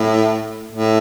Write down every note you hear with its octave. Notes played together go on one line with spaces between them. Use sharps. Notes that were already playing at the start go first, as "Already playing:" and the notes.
Already playing: A2
A2